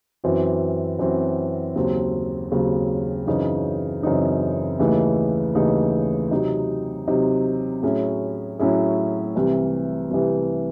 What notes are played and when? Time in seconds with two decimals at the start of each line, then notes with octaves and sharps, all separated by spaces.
0.24 F#2 E3 C4 F#4
0.99 F#2 E3 C4 F#4
1.76 D#2 C#3 F#3 C4
2.52 D#2 C#3 F#3 C4
3.27 F#2 C#3 E3 C4 D#4
4.03 F#2 C#3 E3 C4 D#4
4.79 D#2 C#3 E3 A3 D#4
5.55 D#2 C#3 E3 A3 D#4
6.31 C3 F#3 C4 D#4
7.07 C3 F#3 C4 D#4
7.83 A2 F#3 C#4 E4 G#4
8.59 A2 F#3 C#4 E4 G#4
9.35 C2 C3 E3
10.11 C2 C3 E3